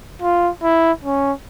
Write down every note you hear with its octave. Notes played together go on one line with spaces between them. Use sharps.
F4
E4
C#4